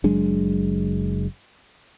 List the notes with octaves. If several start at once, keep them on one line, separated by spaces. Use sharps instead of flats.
F#1 F#3 G#3 D4